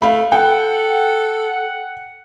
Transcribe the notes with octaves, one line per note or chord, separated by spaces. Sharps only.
A3 F5 B5
A4 F#5 G5